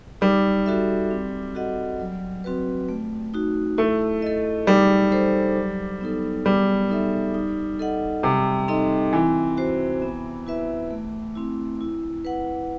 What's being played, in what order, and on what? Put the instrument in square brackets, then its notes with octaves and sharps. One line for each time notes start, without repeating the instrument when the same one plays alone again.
[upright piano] G3 [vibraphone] D#4
[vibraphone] F#4 A4 E5
C4
F#4 A4 D#5 F#5
F#3
C4 F#4 B4
A3
D#4 F#4
[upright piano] A3 [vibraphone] E4
[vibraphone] A4 D#5
[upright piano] G3 [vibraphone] D#4
[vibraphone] A4 C5
F#3
B3 D#4 A4
[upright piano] G3 [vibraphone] B3
[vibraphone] D#4 A4 E5
D#4
A4 D#5 F#5
[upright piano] C3 [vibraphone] G3
[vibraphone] C4 D#4 A4 D#5
[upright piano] E3 [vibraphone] C4
[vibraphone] F#4 C5
B3
E4 B4 E5
A3
C4 E4
E4
B4 F#5